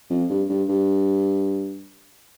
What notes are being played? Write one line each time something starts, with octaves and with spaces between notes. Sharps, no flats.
F2
G2
G2
G2